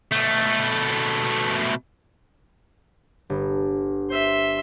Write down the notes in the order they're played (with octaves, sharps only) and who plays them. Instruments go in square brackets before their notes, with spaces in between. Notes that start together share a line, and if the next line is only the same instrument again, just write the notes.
[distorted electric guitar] B2 A3
[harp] G1
[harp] C5 [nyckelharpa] E5 C6